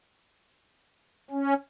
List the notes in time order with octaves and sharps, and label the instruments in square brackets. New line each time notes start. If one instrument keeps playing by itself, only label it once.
[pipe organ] C#4